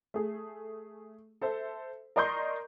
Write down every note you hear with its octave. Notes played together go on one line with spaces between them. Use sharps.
A3 G#4
A4 C5 E5
A#4 D5 D#5 C6 C#6 G6